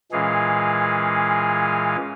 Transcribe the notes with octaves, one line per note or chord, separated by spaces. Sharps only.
A#2 E3 G#3 C#4 G#4 F5